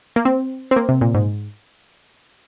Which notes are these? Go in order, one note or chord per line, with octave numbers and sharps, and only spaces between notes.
A#3
C4
C4
A#3
C3
A#2
G#2